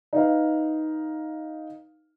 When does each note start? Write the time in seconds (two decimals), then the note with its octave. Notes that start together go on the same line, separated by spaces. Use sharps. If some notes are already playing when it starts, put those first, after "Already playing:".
0.13 D#4 B4 F5